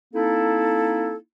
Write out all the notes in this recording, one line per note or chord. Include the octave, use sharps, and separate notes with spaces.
A#3 C4 D#4 E4 A4